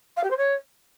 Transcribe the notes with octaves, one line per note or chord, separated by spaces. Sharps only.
F5
G4
C5
C#5